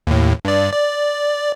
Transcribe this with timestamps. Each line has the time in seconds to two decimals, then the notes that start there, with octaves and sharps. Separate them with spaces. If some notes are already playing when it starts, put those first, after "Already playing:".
0.07 D#2 A2
0.45 G2 D5
0.73 D5